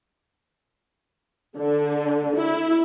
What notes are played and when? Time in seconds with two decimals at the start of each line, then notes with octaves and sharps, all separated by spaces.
1.59 D3
2.37 E4